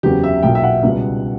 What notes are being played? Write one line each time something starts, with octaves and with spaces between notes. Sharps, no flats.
F#1 E2 C#3 F#3 G4
E5
B1 A#2 F#3 G5
E5
F#5
C#2 B2 G3